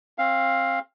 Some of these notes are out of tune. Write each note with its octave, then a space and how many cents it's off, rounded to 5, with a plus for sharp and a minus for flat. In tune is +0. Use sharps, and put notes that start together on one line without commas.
C4 +30 F5 +0